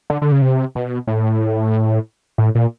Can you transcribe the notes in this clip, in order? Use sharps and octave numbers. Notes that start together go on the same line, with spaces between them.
D3
D3
C#3
C3
B2
A2
A2
A#2